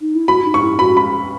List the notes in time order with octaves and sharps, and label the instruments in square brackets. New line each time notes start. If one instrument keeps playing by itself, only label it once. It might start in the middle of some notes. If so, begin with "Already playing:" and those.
[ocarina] D#4
E4
[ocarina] F#4 [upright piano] B5
[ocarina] D#4
[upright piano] C#6
[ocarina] E4
[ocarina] F#4 [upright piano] B5
[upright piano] B5